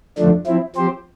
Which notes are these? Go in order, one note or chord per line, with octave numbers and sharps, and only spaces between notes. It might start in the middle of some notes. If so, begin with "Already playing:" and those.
F2 D3 F3 A3 D4
F3 C4 E4
F3 C4 G4 C5